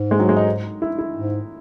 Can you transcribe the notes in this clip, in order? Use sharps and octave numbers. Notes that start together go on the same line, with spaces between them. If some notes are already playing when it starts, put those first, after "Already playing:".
Already playing: G#2
G#3
F#3
G#3
D#4
E4
E4
G#2